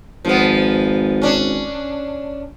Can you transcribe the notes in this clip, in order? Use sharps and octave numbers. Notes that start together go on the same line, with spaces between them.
G#1 F3 B3
C#4 D4